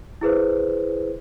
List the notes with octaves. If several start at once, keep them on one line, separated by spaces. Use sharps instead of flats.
E4 G#4 B4 C5